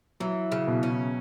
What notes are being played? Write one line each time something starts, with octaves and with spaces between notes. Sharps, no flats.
E3 F#3
C#3
B2
C#4